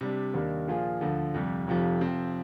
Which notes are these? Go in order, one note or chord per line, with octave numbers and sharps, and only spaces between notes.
C3 G3 D4
D#2 D#3 G3 A#3 D4
A#2 F3 A#3 F4 G#4
D2 D3 F3
F2 C3 G3
F1 F2 C3 F3
C3 F3 C4